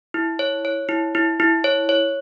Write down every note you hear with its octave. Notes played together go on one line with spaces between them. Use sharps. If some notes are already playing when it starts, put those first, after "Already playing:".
E4
C#5
C#5
E4
E4
E4
C#5
C#5